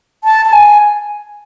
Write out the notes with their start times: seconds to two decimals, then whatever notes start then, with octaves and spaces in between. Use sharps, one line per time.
0.24 A5
0.45 A5
0.53 G#5